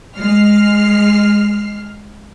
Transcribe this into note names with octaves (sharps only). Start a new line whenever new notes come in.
G#3 F6 C7